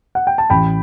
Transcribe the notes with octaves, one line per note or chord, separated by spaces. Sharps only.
F#5
G5
A5
A1 G5 B5